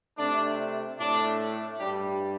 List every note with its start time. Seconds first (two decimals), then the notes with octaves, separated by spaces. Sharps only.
0.18 C3 A3 D4
0.98 A2 A3 D4
1.79 G2 G3 D4 G4